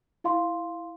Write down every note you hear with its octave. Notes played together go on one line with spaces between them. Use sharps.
E4 F5 C6